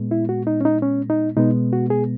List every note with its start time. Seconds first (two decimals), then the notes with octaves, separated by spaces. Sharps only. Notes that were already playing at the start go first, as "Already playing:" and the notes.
Already playing: A#2 G#3 B3
0.11 E4
0.29 F#4
0.47 D#4
0.61 C#4
0.65 D#4
0.82 C#4
1.10 D#4
1.37 B2 G#3 B3 D#4
1.73 F#4
1.90 G#4